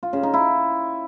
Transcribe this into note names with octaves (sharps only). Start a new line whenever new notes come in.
F4
C#3
D#4
E4